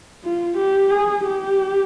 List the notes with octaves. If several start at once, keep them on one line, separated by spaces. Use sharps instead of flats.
F4
G4
G#4
G4